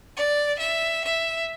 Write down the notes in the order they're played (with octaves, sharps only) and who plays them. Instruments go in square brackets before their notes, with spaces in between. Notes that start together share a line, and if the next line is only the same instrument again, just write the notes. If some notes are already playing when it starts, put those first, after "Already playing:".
[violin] D5
E5
E5